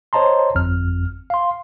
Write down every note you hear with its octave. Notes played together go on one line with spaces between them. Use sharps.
C5 C#5 D#5 A5 A#5 C6
G1 F2 F6
F5 C6